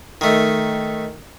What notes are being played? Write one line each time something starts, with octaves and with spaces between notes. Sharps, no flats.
D#3 A3